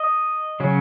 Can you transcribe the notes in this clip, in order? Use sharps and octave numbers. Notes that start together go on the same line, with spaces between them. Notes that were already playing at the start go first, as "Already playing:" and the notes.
Already playing: D#5
C#3 F#3 C#4